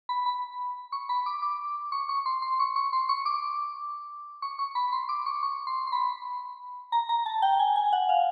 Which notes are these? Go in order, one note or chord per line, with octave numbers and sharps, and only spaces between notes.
B5
B5
C#6
B5
D6
D6
C#6
C#6
C6
C6
C#6
C#6
C6
C#6
D6
C#6
C#6
B5
C6
D6
C#6
C#6
C6
C6
B5
A#5
A#5
A5
G5
G#5
G#5
F#5
F5